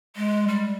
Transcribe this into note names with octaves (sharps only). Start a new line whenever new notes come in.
G#3
G3